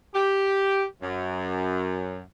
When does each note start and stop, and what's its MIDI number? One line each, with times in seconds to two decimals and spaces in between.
0.14 0.84 67
1.02 2.20 42